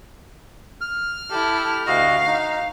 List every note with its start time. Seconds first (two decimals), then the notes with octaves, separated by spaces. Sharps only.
0.81 F6
1.30 E4 G4 A4
1.87 D2 F#4 D#5 F5
2.26 D#4